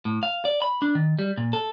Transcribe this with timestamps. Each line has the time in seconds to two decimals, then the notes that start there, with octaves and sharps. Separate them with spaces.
0.05 A2
0.23 F5
0.45 D5
0.62 B5
0.82 D4
0.95 D#3
1.19 G3
1.37 A#2
1.53 A4